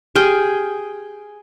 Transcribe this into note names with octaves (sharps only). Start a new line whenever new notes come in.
G4 G#4 G5 F6 G7